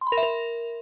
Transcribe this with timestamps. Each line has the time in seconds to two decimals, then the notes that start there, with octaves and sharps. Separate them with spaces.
0.01 C6
0.07 B5
0.12 A#4
0.17 E5
0.23 A#4